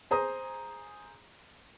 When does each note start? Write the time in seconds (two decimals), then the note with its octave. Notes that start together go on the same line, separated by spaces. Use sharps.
0.11 G#4 C5 A#5 D#6